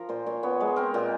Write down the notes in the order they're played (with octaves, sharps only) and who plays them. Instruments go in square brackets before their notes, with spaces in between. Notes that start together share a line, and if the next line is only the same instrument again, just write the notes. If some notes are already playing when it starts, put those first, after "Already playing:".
Already playing: [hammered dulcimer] F3 A#4
A#2 C5
A#2 C#5
B3 C#5
G#3 B4
C4 A#4
A#2 G4